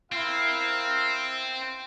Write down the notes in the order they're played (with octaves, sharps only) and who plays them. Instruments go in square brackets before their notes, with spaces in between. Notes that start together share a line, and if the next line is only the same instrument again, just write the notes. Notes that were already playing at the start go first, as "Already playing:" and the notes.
[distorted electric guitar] C4 [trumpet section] E4 A#4 F5